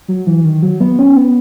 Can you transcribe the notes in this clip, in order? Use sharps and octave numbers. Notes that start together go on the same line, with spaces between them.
F#3
E3
D#3
F#3
B3
C#4
B3